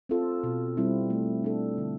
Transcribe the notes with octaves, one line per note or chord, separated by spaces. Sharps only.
C4 F4 A4
B2
G3 C4 E4
A3
D4 A4
D3